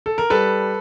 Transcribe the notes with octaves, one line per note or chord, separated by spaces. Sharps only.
A4
A#4
G3 A4 B4